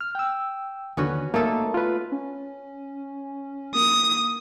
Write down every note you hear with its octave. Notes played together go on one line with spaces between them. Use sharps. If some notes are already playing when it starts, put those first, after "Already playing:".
F6
G5 E6
D#2 D3 B3 C#4 F#4
A3 A#3 D#4 A4
F4 B4
C#4
A#3 D#6